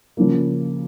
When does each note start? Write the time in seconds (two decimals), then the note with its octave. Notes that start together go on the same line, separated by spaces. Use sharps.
0.17 C#3 F3 A#3